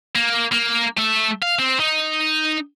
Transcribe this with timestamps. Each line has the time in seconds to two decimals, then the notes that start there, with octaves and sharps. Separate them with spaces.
0.15 A#3
0.52 A#3
0.97 A3 E5
1.42 F5
1.59 C4
1.80 D#4